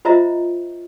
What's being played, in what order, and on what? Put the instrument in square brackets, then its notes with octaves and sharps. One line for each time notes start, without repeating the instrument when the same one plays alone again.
[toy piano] F4 C5 D#5 E5 A#5